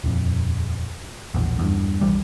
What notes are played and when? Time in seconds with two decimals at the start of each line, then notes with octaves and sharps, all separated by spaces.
0.04 D#1 F2
1.34 E1 A#1 E2
1.59 E2 G2
2.01 B1 F2 E3 G3